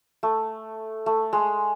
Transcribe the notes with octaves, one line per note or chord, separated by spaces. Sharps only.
A3
A3
G#3